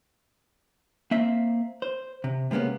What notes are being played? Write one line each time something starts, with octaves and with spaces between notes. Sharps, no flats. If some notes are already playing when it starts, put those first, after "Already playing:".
A#3 C4 E5
C5
C3
C3 G#3 A#3 B3 C#4